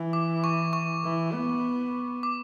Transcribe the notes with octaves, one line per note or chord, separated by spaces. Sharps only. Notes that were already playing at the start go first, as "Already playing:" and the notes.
Already playing: E3
D6
C#6
C#6
E3
B3
D6